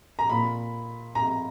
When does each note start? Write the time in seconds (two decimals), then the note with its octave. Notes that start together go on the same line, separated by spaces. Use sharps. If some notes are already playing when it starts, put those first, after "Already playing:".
0.19 A#5
0.29 A#2 B5
1.15 A#5